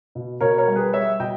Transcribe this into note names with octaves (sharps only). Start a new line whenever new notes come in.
B2
B2 A#4 C#5
A#4 C#5
G3
G#4 B4
G3 C#5 E5
B2 D#5 G5